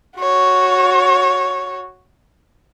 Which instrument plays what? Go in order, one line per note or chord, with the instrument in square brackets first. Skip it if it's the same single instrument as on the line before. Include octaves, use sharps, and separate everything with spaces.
[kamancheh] F#4 C#5